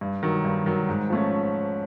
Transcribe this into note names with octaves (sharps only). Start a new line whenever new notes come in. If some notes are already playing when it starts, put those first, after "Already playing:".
G2
D#3 F#3
G2
D#3 F#3
G#2
F3 A3 C#4